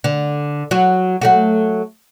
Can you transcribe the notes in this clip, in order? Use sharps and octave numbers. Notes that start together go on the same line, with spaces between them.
D3
F#3 F#4
F#3 A3 F#4